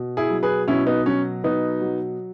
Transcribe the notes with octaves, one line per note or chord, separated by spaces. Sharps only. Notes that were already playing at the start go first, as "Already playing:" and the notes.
Already playing: B2
E4 G#4
F#3
G#4 B4
B2 C#4 E4
B3 D#4
F#3 C#4
B2 B3 D#4
F#3